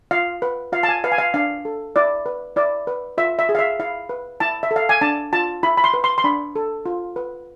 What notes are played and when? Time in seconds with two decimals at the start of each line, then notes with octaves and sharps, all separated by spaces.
0.11 F4 F5
0.42 B4
0.72 F4 F5
0.83 A5
0.88 G#5
1.04 B4 F5
1.12 G#5
1.18 F5
1.34 D4 F5
1.65 A4
1.96 E4 D5
2.26 B4
2.56 E4 D5
2.87 B4
3.18 F4 E5
3.39 E5
3.49 G#4
3.55 F5
3.59 E5
3.79 E4 F5
4.09 B4
4.40 E4 A5
4.63 E5
4.71 A4
4.76 F5
4.89 G#5
5.01 D4 A5
5.33 F4 A5
5.63 E4 B5
5.77 B5
5.84 C6
5.94 B4
6.04 C6
6.18 C6
6.24 D4 B5
6.56 A4
6.86 F4
7.16 B4